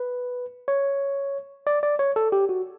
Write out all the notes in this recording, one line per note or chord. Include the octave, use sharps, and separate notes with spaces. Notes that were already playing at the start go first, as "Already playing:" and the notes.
Already playing: B4
C#5
D5
D5
C#5
A4
G4
F#4